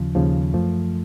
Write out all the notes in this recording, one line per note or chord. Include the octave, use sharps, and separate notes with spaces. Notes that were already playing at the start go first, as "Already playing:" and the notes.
Already playing: D#2 C#3 F3
D#2 C#3 F3
F#2 F3 A3